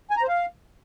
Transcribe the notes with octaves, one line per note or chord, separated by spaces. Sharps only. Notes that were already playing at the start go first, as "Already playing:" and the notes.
G#5
A#5
C5
F5